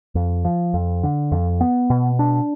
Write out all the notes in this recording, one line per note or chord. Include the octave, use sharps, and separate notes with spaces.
F2
F3
F2
D3
F2
B3
B2
D4